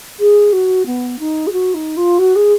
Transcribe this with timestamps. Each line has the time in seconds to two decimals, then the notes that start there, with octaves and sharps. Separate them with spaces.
0.20 G#4
0.53 F#4
0.86 B3
1.20 D#4
1.47 G#4
1.52 F#4
1.74 D#4
1.97 F4
2.19 F#4
2.36 G#4